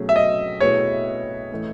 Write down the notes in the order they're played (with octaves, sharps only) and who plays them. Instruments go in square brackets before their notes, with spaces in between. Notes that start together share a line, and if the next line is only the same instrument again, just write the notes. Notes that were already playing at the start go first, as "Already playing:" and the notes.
Already playing: [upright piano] B2 F#3 A3 C#4 G#4
[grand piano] E5
D#5
[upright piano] B2 A3 E4 G#4 B4 [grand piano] C#5
[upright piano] A2 E3 A3